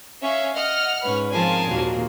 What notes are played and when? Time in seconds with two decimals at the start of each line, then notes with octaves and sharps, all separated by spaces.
0.22 C#4 C#5 E5 F5
0.56 D#5 F#5 F6
1.02 G#2 C#4 B4 C#5
1.32 F3 C4 F4 G#4 A#4 G#5 A5
1.67 D#2 A#2 A#3 F4 F#4